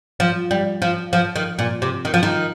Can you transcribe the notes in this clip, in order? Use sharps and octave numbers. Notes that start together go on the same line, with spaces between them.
F3
G3
F3
F3
D#3
A#2
C3
D#3
F3
D#3